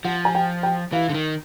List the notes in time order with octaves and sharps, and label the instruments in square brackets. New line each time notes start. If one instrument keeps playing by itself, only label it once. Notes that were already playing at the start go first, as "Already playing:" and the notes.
[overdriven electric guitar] F3 [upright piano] F#5
[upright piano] G#5
G5
G5
[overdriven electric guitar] E3 [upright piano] F5
[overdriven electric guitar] D3
D#3